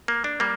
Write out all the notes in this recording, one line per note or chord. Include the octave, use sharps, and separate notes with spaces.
A#3
D4
G3 A#3